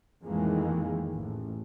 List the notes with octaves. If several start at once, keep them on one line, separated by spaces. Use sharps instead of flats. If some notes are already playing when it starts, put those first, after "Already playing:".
F2 A2 D#3 E3 G#3 A#3
A1